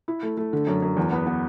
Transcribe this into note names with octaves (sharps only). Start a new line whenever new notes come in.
E4
A3
A3
D3
F#2
F#2
E2
B3
B3